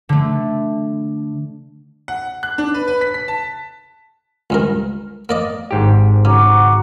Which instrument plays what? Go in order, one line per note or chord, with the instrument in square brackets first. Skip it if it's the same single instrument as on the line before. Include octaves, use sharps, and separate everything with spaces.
[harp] D3 A3
[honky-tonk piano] F#5
F#6
D4
B4
B4
B6
B6
A5
[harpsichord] C#2 G2 A#4
A#3 D5 D#5
[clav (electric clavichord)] G#1 G#2 G4
[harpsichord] C#3 [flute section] F#4 A#5 D6